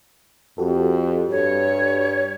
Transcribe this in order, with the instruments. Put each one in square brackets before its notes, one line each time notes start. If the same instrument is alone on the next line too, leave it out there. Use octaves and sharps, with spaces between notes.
[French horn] F2 [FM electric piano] F#4 G4 A4
[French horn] G2 [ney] C#5